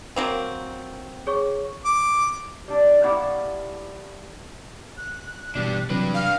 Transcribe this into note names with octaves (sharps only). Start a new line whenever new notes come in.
F#3 A#3 C4
G#4 C#5 C#6
D6
G3 D4
A2 A#3 E4 G4 D5 F#5
F#6
B2 E3 G3 D4
C3 E3 F#3 D4 B4
F5